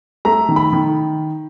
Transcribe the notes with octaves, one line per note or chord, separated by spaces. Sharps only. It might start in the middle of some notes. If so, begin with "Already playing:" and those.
A3 A#5
D#3
B5
D#3